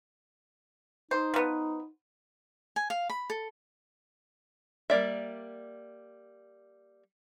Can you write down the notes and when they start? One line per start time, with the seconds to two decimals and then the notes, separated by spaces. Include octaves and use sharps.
1.11 D#4 C5
1.34 F3 B3
2.76 G#5
2.90 F5
3.10 B5
3.30 A4
4.90 G3 A#3 D5 E5